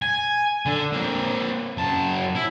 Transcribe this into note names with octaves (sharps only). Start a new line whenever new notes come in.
G#5
D3
A#3 C4
F#2 A5
E4